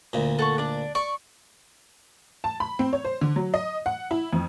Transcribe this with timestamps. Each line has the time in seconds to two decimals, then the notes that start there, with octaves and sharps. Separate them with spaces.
0.13 D2 A#2
0.39 A4 F#5 C#6
0.58 D4 D5
0.95 D5 C#6
2.44 A5
2.60 B5
2.79 C4
2.93 C#5
3.04 C5
3.21 D3
3.36 F#3
3.54 D#5
3.86 F#5
4.11 E4
4.33 F2